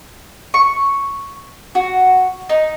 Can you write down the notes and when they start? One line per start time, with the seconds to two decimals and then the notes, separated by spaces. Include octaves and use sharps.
0.54 C#6
1.75 F#4
2.49 D#4